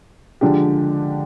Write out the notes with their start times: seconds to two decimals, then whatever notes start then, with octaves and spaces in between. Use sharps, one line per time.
0.41 D3 F3 G#3 D4 G4